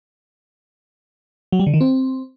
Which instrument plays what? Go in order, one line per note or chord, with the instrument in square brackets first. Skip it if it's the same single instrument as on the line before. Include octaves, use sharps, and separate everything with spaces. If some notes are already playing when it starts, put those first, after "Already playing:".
[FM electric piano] F#3
G3
D3
D#3
C4